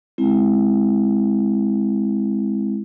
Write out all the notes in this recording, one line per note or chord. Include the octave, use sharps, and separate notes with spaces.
G#3 C4 E4